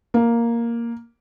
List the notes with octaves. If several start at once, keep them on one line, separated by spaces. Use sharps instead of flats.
A#3